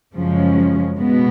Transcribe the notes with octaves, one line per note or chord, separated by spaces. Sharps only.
F#2 C#3 F3 G#3 C#4
B2 G#3 B3